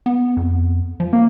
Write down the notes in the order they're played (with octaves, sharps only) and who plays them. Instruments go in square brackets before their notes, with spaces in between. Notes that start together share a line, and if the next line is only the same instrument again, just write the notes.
[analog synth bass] B3
F2
F3
[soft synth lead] A#3